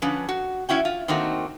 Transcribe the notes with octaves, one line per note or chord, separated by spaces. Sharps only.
D3 F3 C#4 B4
F#4
C#4 E4 F#4 G5
F4
D#3 A3 A#3 C4 D#4 F#4